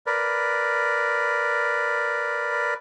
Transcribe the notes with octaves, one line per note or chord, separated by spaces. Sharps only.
A#4 B4 D5